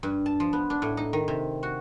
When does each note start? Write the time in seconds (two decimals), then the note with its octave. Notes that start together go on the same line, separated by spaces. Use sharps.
0.03 G2
0.26 A5
0.40 F3
0.53 B3
0.70 D4
0.82 A2
0.97 D#4
1.13 D#3
1.28 C3
1.63 F#4